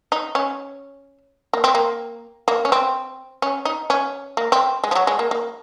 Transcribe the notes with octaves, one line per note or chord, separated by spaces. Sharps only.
D#4
C#4
A#3
C4
A#3
A#3
C#4
C4
C#4
D#4
C#4
A#3
C4
G#3
F3
F#3
G#3
A#3
A#3